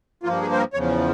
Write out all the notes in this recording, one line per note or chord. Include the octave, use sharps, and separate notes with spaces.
G2 F3 A#3 F4
G#4
C5
A#4
E2 C#3 F3 C#5